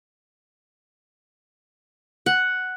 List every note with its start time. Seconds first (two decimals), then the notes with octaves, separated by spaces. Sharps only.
2.26 F#5